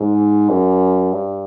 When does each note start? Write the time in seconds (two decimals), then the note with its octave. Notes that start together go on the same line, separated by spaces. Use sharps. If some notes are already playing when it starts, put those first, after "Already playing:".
Already playing: G#2
0.49 F#2
1.13 G2